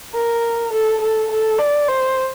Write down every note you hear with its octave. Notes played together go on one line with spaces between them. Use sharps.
A#4
A4
A4
A4
D5
C5